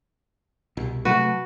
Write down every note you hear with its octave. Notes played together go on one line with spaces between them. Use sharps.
C2 B2
C3 F#3 A3 F#4 B4